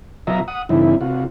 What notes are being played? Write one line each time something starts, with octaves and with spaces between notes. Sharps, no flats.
B2 F#3 F4 D#5 E5 A#5
F#5 D#6
G2 C#3 E3 C4 D#4 E4
C3 F4 F#4